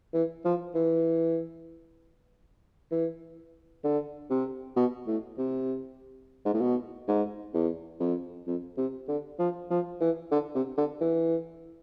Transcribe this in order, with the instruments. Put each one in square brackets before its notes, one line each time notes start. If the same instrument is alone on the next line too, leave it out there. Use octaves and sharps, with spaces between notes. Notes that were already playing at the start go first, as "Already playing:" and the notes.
[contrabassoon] E3
F3
E3
E3
D3
C3
B2
A2
C3
G#2
A2
B2
G#2
E2
F2
F2
C3
D3
F3
F3
E3
D3
C3
D3
E3